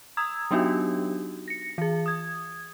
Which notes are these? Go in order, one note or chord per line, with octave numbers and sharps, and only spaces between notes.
A#5 D#6 E6 G#6
F#3 B3 D4 D#4 F#4 G4
A#6 C#7
E3 G#4
D#6 G#6